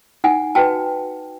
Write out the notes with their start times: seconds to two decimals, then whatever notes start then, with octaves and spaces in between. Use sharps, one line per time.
0.24 D#4 F#5 G#5
0.55 F#4 B4 G5 A5